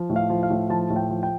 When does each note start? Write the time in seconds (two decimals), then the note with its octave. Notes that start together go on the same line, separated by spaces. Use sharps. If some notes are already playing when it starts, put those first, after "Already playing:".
Already playing: F3
0.10 A2
0.16 F5
0.29 F3
0.43 F5
0.50 A2
0.69 F3 A5
0.90 A2
0.96 G5
1.09 F3
1.23 G5